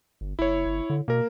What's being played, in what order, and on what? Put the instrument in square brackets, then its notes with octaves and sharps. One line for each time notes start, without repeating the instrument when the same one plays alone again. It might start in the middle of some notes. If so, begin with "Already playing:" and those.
[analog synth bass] G1
[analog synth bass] F#1 [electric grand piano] E4 C#5
[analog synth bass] G1
D3
[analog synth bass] B2 [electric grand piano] A#3 A#4